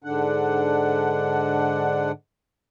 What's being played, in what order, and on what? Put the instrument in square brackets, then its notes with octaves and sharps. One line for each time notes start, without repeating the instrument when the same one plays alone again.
[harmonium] G#2 D3 D4 F#5